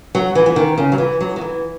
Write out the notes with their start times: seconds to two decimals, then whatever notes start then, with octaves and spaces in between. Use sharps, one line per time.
0.15 F#3
0.35 E3
0.46 E3
0.56 D#3
0.78 C#3
0.92 F#3
0.98 E3
1.20 F#3
1.36 D#3
1.41 E3